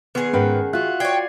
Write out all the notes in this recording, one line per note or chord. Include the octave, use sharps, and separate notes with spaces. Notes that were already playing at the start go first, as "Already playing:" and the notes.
D#3 B3 G#4 B4
G#2 C#4 A#4 B4 F#5 G5
F4 F#4 E5 F#6
C#5 D5 G5 G#6 C7